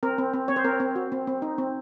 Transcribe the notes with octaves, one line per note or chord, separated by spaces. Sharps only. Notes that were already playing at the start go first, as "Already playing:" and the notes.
C4 A#4
C4
C4
C4 C#5
C5
C4 A#4
C4
F#4
C4
C4
D#4
C4